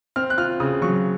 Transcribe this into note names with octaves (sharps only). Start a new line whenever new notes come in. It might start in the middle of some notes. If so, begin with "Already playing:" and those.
C4 F6
F#6
F4 F6
C#3 D#6
F#3 C#6